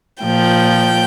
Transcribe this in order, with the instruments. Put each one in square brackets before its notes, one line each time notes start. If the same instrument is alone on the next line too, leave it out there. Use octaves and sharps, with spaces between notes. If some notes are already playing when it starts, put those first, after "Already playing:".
[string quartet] A#2 F3 G5